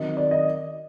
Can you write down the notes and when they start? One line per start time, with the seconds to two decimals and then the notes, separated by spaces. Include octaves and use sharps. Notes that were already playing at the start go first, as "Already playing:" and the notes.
Already playing: D#3 F#3 C4 D#5
0.17 D5
0.31 D#5